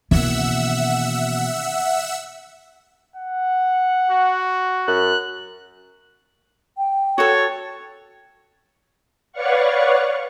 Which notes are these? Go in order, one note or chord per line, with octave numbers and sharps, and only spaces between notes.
B2 D#3 E3 A#3 C#4 E5 F#5 E6
F#5
F#4
F#2 F#6
G5
F#4 A4 C#5
B4 C#5 D5 F5 F#5 C#6